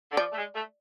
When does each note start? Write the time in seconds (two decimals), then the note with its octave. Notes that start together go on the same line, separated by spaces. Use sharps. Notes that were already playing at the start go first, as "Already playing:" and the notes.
0.11 D3
0.17 F3 D5
0.32 A3
0.37 G#3
0.55 A3